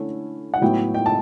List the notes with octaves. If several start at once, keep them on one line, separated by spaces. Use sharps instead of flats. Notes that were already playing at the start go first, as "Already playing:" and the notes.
Already playing: D3 A3 C#4 E4
F#5
A2 F#3 B3 E4 G5
G5
A5